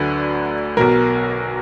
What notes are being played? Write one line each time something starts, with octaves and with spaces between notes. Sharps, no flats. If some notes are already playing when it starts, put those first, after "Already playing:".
Already playing: D2 D3 F#3 B4
B1 B2 F#3 A#4